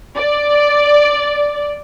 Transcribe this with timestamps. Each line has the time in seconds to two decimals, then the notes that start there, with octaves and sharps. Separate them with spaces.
0.16 D5